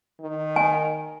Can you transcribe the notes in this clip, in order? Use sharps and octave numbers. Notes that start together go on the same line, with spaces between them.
D#3
G#5